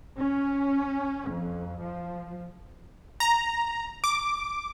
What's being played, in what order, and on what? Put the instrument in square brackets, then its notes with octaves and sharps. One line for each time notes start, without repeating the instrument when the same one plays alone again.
[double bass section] C#4
F2
F3
[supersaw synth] A#5
D6